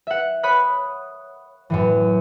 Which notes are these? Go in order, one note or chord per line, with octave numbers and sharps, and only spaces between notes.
E5 F#5
C#5 B5 D#6 F#6 B6
F#2 A2 E3